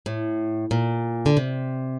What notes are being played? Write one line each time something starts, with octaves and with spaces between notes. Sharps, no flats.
A2
A#2
D3
C3